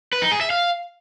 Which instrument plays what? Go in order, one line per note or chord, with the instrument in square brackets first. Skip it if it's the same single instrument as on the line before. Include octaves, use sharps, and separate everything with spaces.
[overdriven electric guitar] B4
D#4
G#4
E5
F5